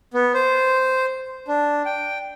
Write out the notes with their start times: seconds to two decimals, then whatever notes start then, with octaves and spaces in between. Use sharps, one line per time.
0.14 B3
0.34 C5
1.48 D4
1.85 G5